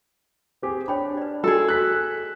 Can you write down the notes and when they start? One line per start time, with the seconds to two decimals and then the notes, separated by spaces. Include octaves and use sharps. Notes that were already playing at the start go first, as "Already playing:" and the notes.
0.62 C4 G4 G#4
0.88 D4 C#5 G5 B5
1.17 B4 D5
1.44 F#4 G#4 A4 D#5
1.69 F#6 B6